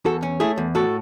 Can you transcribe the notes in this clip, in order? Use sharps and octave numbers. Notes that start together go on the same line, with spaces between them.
E2 F#4 A4
C#4
A3 E4 G#4
E2
A2 F#4 A4